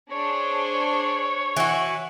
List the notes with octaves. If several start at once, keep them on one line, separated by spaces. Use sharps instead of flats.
D4 G#4 C5 C#5
E3 F#4